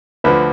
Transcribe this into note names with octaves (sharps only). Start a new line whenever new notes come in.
D2 D3 F3 B4